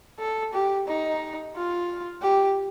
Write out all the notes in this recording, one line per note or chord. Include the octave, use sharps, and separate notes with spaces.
A4
G4
D#4
F4
G4